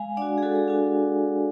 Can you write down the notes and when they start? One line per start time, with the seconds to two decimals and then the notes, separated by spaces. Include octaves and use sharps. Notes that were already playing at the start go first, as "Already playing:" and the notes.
Already playing: G#3 F5 G#5
0.17 D4 F#4 D5 F#5
0.38 G#4
0.42 G#3 F#4 A4
0.55 G#4
0.67 D4 F#4 G#4